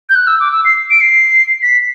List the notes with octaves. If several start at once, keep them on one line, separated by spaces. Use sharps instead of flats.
G6
F#6
E6
D6
E6
C7
D7
C7
B6